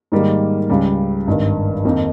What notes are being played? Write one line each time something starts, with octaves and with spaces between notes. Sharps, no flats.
G#2 D#3 G3 A#3
C#2 C#3 G3
G#1 G2 D#3
F2 D#3 A#3 D#4